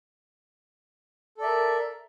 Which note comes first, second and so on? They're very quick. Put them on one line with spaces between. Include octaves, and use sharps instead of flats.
A4 D5 E5 A#4